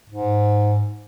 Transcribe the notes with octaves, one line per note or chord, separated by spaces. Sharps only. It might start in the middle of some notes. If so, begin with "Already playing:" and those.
G#2